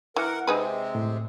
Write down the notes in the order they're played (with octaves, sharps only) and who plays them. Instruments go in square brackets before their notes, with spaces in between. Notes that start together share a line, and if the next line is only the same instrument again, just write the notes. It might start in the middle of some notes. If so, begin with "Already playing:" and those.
[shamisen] E3 [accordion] A#4 F#5
[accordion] C3 G#3 C4 [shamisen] D#4 G#4 B4
[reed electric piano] A2